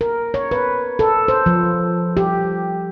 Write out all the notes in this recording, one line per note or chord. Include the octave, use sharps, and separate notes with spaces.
A#4
C#5
B4
A4
C5
F3
G4